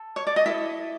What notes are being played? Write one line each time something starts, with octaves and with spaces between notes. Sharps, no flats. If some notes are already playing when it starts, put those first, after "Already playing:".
Already playing: A4
C#5
D5
D#5
E4 A4 E5